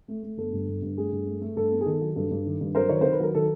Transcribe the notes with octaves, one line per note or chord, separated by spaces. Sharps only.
A3
A3
G1 A4
G2
G1
G2
A3 G#4
G2
A3
A3
G2 A4
B3
G#4
D#3 A4
F#3
G2 A4
G2
D#3
G2
F#3 A#4 C5
D#3 C#5
D#3 C5
B4
F#3 A#4
D#3 A4